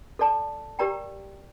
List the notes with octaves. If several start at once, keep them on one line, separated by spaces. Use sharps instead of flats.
A4 D5 A5
G4 A#4 D5 G5 A#5